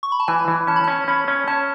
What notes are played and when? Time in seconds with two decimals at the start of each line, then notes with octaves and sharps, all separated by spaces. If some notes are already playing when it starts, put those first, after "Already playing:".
0.03 C#6
0.12 B5
0.20 A5
0.28 E3 G#5
0.48 E3
0.67 C#4 A5
0.76 B5
0.84 C#4 A5
1.08 C#4 B5
1.28 C#4
1.48 C#4 A5